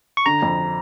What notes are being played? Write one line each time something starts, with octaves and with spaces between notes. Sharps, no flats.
C#6
D3 A#5
F2